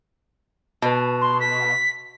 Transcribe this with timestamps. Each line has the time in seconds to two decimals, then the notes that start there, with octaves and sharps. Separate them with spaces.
0.82 B2 B4 A5
1.21 C6
1.40 B6